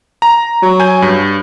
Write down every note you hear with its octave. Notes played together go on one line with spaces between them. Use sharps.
A#5
F#3
G#5 G6
G2